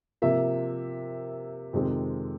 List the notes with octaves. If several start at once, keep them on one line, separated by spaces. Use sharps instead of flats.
C3 F3 A#3 E5
F2 C3 D#3 G#3 C4